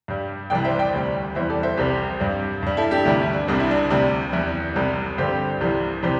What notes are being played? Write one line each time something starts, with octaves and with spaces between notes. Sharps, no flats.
G2 G3
C2 C3 E3 G3 D5 G5
C5 E5
D5 G5
D2 C3 G3
E2 E3 G3 C5 E5
A4 D5
C5 E5
C2 C3 G3 G4 C5
G2 G3
G2 G3
E4 A4
D4 G4
D2 C3 E3 G3 E4
E4
D4
C2 C3 G3 D4
E4
D4
D2 C3 G3
E2 E3 G3 E4
C2 C3 G3
G2 D3 G3 G4 C5
C2 C3 E3 G3
C3 E3 G3 G4 C5